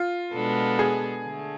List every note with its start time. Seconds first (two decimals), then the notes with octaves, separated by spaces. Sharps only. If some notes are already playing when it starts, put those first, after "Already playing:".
Already playing: F4
0.34 B2 G#3 B3 D4 A4
0.79 G#4
1.25 D3 A3